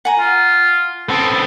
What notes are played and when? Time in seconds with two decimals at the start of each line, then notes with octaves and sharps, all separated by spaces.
0.05 F#5 G#5 A#5
0.19 F4
1.09 B3 C4 A4